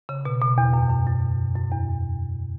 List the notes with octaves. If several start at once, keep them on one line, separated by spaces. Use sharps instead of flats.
C#3
B2
B2
E2
F#2
F#2
F#2
F#2
E2